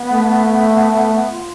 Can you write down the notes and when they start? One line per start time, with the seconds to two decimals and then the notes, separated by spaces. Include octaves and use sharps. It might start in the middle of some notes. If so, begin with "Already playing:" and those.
Already playing: B3
0.12 A3
1.31 F4